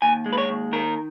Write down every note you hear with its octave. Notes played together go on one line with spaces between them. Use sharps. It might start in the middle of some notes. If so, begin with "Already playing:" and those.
D#2 G#5
G#3
B4
C#5
D#2
D#3 A#4